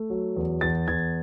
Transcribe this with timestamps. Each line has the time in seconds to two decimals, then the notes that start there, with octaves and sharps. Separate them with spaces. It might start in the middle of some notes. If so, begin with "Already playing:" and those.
Already playing: A3
0.10 F#3
0.37 E2
0.61 E2 A6
0.88 E2 G#6